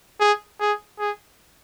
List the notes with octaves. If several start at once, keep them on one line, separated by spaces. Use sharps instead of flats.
G#4
G#4
G#4